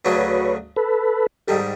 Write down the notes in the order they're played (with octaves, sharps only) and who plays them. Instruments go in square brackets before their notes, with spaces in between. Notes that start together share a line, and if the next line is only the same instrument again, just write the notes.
[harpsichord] D2 C#3 F#3 A3 C#4 [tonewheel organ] B4 C#5
[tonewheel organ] A4 B4
[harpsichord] G#2 D#3 G3 [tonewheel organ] G4 A4